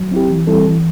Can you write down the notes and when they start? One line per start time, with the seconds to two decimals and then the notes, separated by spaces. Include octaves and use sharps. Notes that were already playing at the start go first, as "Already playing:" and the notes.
Already playing: F#3
0.11 C4 E4 G4
0.30 E3
0.47 G3 C4 E4 A4
0.65 E3